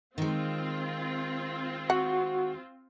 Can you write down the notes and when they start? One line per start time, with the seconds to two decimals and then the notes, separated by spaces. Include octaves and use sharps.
0.18 D#3 G#3 C4 F4
1.90 F#4 F#5